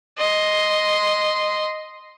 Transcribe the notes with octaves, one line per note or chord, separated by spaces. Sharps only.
D#5 C6